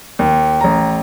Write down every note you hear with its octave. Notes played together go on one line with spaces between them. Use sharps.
D#2
A1 A#5